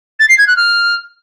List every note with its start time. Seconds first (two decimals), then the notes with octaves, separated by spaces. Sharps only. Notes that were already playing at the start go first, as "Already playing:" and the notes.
0.20 A6
0.29 C7
0.38 G#6
0.47 F#6
0.57 F6